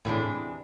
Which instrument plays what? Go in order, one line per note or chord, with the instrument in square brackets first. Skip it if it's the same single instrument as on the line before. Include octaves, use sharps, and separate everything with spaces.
[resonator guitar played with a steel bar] E2 C3 E3 G#3 D4 [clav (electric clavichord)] A2